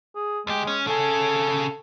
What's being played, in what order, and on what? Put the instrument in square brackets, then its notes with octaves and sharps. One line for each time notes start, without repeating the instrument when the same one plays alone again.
[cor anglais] G#4
[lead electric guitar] D2 G4 [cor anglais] G#3
[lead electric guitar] C#4
[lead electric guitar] C#3 G#4 [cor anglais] A4